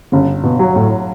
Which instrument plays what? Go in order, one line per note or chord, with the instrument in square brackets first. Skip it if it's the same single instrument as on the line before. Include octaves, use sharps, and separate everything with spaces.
[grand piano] G1 [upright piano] C#3
[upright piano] B2
[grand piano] F#3
[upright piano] A2